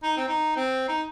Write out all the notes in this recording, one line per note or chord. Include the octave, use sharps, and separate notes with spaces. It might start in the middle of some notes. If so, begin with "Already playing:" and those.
D#4
C4
D#4
C4
D#4